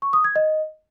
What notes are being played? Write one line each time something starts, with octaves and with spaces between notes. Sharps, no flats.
C#6
D#6
G#6
D#5